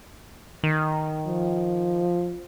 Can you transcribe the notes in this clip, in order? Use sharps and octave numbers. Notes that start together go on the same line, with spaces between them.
D#3
F3